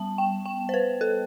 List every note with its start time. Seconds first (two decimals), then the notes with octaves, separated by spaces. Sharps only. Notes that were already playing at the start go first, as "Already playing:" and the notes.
Already playing: G3 B3 A5
0.18 G5
0.45 G5
0.69 C5
0.74 B4
1.01 A4